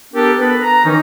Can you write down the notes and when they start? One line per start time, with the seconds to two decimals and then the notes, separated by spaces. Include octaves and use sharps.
0.13 B3 D4 G4 A4 A#4
0.38 B3 D4 A4 B4
0.61 A#5
0.84 D#3 E3 C#4 D#4